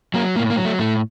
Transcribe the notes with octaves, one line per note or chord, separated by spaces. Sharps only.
F#3 A#3
A2 A#3
A#3
F#3
A3
A2 A3